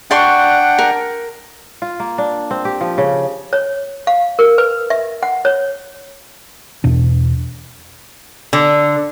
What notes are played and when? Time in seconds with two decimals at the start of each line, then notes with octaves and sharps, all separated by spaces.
0.11 D4 D5 F#5 G5 C6 C#6
0.78 A#4
1.82 F4
2.00 A#3
2.18 D4
2.51 C4
2.65 G4
2.81 F3
2.98 C#3
3.53 C#5
4.07 F5
4.39 A#4
4.58 B4
4.90 E5
5.23 F#5
5.45 C#5
6.84 E2 B2 D4
8.53 D3